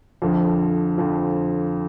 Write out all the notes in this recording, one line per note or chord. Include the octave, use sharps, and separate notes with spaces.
F2 D3 F3
F2 D3 F3